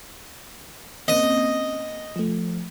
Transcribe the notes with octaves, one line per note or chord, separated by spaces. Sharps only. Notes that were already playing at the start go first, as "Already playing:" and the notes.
A#3 C4 C#4 D#5
F3 A3